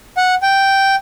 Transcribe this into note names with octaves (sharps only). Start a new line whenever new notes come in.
F#5
G5